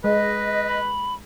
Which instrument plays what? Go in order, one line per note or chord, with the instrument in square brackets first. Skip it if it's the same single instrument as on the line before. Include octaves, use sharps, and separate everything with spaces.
[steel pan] G#3 [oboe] B4 [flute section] D#5
[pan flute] B5